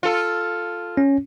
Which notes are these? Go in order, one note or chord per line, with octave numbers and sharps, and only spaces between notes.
F4 A4
C#4